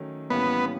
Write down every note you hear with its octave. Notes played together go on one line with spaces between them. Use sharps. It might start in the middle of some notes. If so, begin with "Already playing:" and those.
Already playing: D#3 F#3 A3 C#4
A2 E3 G3 A#3 B3 C#4